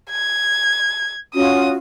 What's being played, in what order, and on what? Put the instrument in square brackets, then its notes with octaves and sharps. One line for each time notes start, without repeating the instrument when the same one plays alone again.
[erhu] G#6
[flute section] C#4 F4 F#4 [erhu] D#6